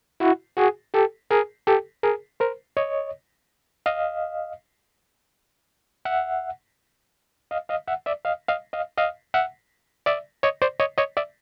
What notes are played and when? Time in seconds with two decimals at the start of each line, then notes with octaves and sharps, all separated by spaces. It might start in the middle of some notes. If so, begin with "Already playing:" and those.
0.20 E4 F#4
0.57 F#4 G#4
0.94 G4 A4
1.31 G#4 A#4
1.67 G4 A4
2.03 G#4 A#4
2.40 A#4 C5
2.77 C#5 D#5
3.86 D#5 F5
6.05 E5 F#5
7.51 D#5 F5
7.69 D#5 F5
7.87 E5 F#5
8.06 D5 E5
8.25 D#5 F5
8.48 D#5 F5
8.73 D#5 F5
8.98 D#5 F5
9.34 E5 F#5
10.06 D5 E5
10.43 C#5 D#5
10.62 C5 D5
10.80 C#5 D#5
10.98 C#5 D#5
11.17 D5 E5